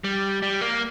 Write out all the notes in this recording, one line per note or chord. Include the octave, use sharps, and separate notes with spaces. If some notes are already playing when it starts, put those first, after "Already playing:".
G3
G3
A#3